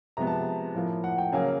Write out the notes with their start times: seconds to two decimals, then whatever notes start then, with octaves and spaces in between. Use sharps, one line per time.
0.17 C3 F3 G#3 B3 A#5
0.27 A5
0.75 A2 F3 A#3
1.04 F#5
1.18 G5
1.32 C#3 F#3 A#3 G#5